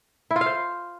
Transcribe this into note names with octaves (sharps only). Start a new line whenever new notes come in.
E4
F4
F5
C5